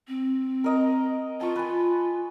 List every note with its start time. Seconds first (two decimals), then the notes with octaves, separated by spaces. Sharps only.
0.08 C4
0.64 A#4 D#5 A#5
1.41 F4 A5 C#6
1.56 B4 G#5